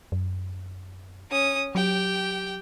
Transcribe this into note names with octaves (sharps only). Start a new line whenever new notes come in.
F#2
C#4 D#6
F#3 G4 G5